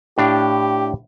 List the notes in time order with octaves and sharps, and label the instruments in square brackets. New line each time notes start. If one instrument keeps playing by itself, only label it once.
[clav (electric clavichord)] A2 D4 F5 [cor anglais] G4